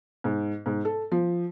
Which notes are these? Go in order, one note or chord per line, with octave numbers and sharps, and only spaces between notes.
G#2
G#2
A4
F3